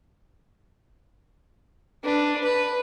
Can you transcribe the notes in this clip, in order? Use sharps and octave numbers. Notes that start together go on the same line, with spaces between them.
D4 B4
B4